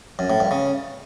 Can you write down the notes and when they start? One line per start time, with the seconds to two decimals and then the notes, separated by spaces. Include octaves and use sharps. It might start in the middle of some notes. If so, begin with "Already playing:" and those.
0.19 F#2
0.30 A2
0.40 G2
0.51 C#3